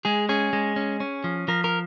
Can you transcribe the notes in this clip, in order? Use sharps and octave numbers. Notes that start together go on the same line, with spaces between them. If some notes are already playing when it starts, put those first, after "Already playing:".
G#3 G#4
C#4 G#4
G#3
C#4
C#4
F3
F3 A#4
A#4